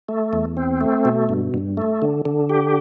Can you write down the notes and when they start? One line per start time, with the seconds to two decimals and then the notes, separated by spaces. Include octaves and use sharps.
0.09 A3
0.33 E2
0.57 C4
0.81 A3
1.05 B2
1.29 G2
1.54 G2
1.77 A3
2.02 D3
2.25 D3
2.50 G4